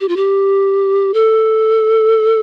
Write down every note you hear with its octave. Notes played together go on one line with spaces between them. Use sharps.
G4
F4
G4
A4